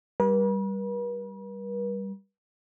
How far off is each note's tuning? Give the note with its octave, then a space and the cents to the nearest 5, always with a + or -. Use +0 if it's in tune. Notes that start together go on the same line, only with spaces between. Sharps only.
G3 +0 B4 -45